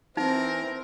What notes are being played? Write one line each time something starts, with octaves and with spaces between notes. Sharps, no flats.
E3 C4 D#4 A#4